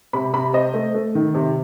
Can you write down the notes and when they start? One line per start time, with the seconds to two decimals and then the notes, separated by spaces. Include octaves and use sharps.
0.13 C3 B5
0.33 C3 B5
0.53 C4 D#5
0.74 A3
0.94 A3
1.15 D#3
1.35 C3